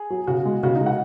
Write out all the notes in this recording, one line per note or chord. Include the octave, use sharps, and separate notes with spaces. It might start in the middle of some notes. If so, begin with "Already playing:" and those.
Already playing: G#4
F#3
C#3 F#4
G#3
C#3 F#4
D#4
G#3
F#5